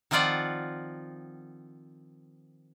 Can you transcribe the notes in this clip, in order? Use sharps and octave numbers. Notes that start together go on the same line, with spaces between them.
D#3 F3 C4 F4 D5 F#5